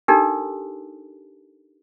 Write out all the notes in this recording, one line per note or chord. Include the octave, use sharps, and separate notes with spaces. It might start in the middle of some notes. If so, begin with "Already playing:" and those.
D4 D#4 G4 A4 A#4